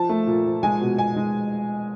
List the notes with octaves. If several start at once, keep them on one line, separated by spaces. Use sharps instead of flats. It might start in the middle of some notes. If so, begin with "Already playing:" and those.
Already playing: F3 A5
A3
A#2
F3
G#3 G#5
B2
B2 G#5
G#3